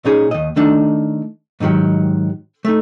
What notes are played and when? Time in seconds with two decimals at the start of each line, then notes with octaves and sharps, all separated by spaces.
0.05 A#2 C#4 D#4 G#4
0.31 D#2 D#5
0.56 D#3 A3 D4 D#4
1.60 G#2 D3 D#3 F#3 G4
2.65 A3 D#4